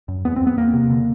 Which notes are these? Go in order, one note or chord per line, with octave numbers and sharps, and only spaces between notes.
F#2
E2 B3
E2 C4
B3
E2 A#3
C3
D3